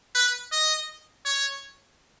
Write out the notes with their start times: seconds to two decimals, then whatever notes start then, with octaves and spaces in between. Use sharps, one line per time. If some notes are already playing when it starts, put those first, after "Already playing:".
0.15 B4
0.52 D#5
1.25 C#5